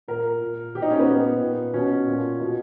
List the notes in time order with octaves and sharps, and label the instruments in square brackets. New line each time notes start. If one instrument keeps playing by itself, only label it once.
[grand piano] A#2 A#4
A#2
B2 G4
D#4
C#4
B3
A#2
A#2
B2 C#4
A#2
B2